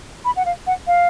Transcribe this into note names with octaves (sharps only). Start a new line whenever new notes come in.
B5
F#5
F5
F#5
F5